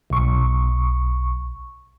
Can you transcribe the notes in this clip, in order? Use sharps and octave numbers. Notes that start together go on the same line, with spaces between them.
B1 C#6